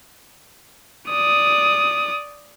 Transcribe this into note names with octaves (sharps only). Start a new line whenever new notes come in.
D5 D#6